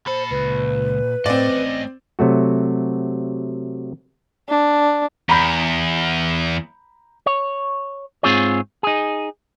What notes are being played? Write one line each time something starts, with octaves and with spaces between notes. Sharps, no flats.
A#2 A4 C5 B5
C#2 B4
A2 C4 D5 D#5
A3 C#4
C3 F#3 A3 F#4
D4
E2 A#5 B5 G6
C#5
G#2 C4 F4 G#4 C#5
D#4 G#4